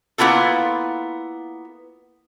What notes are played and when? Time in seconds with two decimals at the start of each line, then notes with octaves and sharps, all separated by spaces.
0.18 A#3 B3 E4 F4 A4